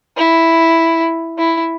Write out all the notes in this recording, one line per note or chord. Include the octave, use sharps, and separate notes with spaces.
E4
E4